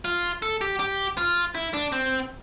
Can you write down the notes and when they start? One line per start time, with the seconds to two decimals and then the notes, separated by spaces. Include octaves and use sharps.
0.05 F4
0.42 A4
0.61 G4
0.80 G4
1.17 F4
1.55 E4
1.74 D4
1.92 C4